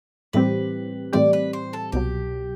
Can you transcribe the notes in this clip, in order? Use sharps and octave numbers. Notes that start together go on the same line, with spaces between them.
A2 E3 G3 C4 G4 B4
A2 E3 G3 C4 G4 D5
B4
C5
A4
C2 B2 F#3 G4